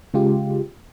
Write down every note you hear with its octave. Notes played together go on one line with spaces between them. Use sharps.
C#3 G#3 F4 G4